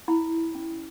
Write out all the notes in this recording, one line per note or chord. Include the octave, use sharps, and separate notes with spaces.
E4 B5
C#4